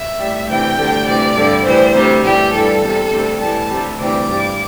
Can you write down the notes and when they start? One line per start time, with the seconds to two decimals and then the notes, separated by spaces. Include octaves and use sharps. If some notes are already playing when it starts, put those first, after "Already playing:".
Already playing: E5
0.18 A2 G3
0.48 D2 C3 E3 G3 G5
0.77 D2 D3 G3
1.06 D2 C3 E3 G3 D5
1.35 G2 D3 G3
1.64 A2 E3 G3 C5
1.94 D2 C3 G3
2.23 A2 E3 G3 G4
2.52 G2 E3 G3 A4
2.81 E2 C3 G3
3.10 D2 C3 G3
3.39 A2 E3 G3 A5
3.69 D2 C3 G3
3.99 D2 C3 E3 G3 D6
4.28 G2 G3